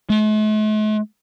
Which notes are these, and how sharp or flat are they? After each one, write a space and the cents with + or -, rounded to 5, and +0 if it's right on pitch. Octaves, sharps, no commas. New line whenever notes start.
A3 -45